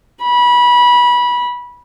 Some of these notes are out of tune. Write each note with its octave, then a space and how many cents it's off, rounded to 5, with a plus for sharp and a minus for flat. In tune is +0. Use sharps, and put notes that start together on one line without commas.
B5 -25